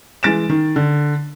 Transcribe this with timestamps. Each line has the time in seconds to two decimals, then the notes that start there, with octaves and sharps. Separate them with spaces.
0.23 E3 G#3 A6 D7 E7
0.49 D#3
0.76 D3